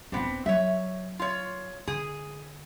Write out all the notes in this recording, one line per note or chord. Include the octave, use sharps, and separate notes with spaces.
D#1 B3 C4 D4 F4
F#3 C#5 E5
F4 C#5
D3 G#4